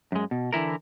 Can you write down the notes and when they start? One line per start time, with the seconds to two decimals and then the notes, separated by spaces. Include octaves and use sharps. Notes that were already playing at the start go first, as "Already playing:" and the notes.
0.12 F#2 G#3
0.31 B2
0.53 D3 E3 E4 A#4